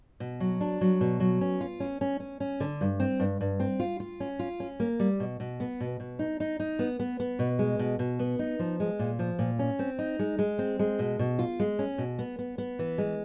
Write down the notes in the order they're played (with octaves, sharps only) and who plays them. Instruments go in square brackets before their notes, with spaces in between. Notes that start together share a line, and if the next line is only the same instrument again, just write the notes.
[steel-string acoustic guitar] B2
F#3
D4
F#3
B2
F#3
C#4
F4
C#4
C#4
C#4
C#4
D3
G2
C4
G2
G2
C4
F4
F4
C#4
F4
C#4
A#3
G3
B2
B2
B3
B2
B2
D#4
D#4
D#4
B3
B3
B3
B2
G#3
B2
B2
B3
D#4
F3
G#3
A#2
F3
A#2
C#4
C4
D#4
G#3
G#3
C4
G#3
B2
B2
F4
G#3
C#4
B2
B3
B3
B3
E3
G#3